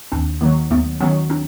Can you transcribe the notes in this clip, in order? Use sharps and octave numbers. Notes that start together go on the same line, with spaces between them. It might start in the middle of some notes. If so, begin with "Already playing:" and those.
D#2 C4 D4
D#3 F#3 A#3
D#2 A3 B3
D#3 F#3 B3 C#4
C4 D4